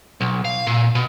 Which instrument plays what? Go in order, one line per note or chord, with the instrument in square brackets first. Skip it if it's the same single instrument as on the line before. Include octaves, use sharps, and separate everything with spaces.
[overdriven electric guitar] B1
F5
A#2
B2